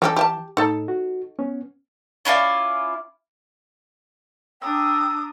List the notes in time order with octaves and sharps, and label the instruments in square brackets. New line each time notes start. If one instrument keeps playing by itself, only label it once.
[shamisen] C#3 G4 A4 [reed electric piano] E3
[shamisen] G4 F5 A5
[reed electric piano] A2 [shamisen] D#4 A4
[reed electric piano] F#4
B3 C#4
[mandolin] C#4 E4 F4 D5
[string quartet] D4 A#5 D#6 [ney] G5 [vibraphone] E6